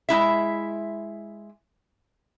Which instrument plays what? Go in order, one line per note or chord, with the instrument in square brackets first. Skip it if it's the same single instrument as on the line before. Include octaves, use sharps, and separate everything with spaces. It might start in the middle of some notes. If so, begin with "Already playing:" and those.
[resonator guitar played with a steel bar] G#3 E4 E5